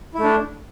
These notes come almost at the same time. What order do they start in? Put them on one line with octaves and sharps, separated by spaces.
E4 A3 D4